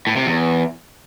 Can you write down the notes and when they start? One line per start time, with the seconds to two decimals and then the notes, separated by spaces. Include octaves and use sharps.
0.07 A2
0.16 C3
0.26 E2